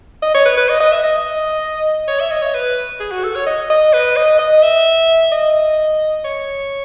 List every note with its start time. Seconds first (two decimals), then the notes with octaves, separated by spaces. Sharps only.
0.22 D#5
0.34 C#5
0.45 B4
0.57 B4
0.69 D#5
0.80 D#5
0.92 E5
1.03 D#5
2.08 C#5
2.20 E5
2.31 D#5
2.42 C#5
2.54 B4
3.00 G#4
3.12 F#4
3.24 A4
3.35 C#5
3.47 D#5
3.70 D#5
3.93 B4
4.17 D#5
4.39 D#5
4.63 E5
5.32 D#5
6.25 C#5